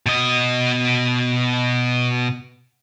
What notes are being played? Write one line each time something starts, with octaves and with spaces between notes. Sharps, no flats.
B2 D#5